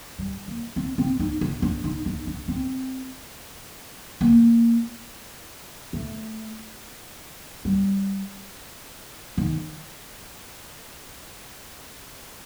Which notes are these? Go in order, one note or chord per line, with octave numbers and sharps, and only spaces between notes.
G3
A#3
C4
C4
D#4
D4
D4
D#4
D#4
D4
C4
A#3
A3
G3
D#3